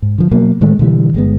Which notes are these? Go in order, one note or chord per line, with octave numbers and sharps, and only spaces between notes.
G#2
D3 F3
B2 F#3 A#3
A2 D#3 G#3 A3
B2 D3 E3 G3
G1 G#3 B3